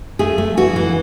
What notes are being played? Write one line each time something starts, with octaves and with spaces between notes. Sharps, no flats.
A3 G#4
A3
E3 F#4
E3